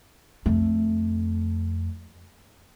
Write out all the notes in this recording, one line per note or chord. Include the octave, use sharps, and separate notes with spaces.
F2 A3